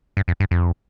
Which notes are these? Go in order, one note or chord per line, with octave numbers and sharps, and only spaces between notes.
G2
F2
G2
F2